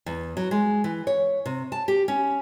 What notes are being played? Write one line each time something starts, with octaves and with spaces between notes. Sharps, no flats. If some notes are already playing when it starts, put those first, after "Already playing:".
E2
F#3
G#3
E3
C#5
C3
A5
G4
C#4